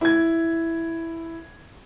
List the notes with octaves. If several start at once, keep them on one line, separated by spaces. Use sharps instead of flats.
E4 G#6